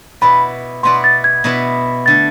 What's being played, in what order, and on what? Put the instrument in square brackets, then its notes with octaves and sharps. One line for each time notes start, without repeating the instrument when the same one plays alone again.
[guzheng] B2 B3 E4 B4 D5 [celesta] B5
[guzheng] B2 B3 E4 B4 D5 [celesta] C6
[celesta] A6
G#6
[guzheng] B2 B3 E4 B4 D5
[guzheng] D3 A3 [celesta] A6